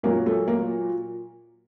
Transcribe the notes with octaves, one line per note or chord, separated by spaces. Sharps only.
A#2 F#3 A#3
A3
A#3